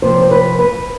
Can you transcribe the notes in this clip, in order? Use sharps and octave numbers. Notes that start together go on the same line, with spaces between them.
C3 F3 C4 C5
C5
B4
B4